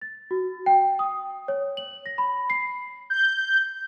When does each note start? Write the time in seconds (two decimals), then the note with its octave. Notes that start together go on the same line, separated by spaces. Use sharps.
0.02 A6
0.31 F#4
0.66 G5
0.99 D#6
1.48 C#5
1.77 F#7
2.06 A#6
2.18 B5
2.50 C7
3.10 G6